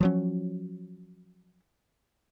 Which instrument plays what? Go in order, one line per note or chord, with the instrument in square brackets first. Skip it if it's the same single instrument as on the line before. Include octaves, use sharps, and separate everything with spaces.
[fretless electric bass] F3 F#3 C#4